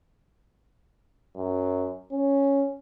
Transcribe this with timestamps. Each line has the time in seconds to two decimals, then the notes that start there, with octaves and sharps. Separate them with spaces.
1.36 F#2
2.11 C#4